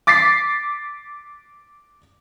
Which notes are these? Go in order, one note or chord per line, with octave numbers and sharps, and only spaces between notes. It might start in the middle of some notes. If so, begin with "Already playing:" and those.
D6 A6 B6 C7